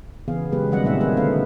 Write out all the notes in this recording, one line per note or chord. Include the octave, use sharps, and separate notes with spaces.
C#3 E3 B3 G#4 F5
C#3 F#3 G#3 B3 G4 B4
D#3 F#3 G3 C#4 D#5 F#5
A#2 A#3 C4 D#4 E5 F#5
A#3 B3 G#4 B4 C5
D3 A3 B3 A4 B4 F5